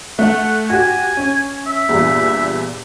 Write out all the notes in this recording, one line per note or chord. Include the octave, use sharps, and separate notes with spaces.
A3 F#5
F#4 G4 G#5
C#4
E5
E2 G2 A#2